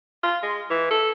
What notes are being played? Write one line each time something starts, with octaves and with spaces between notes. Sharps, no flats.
F4
G#3
E3
A4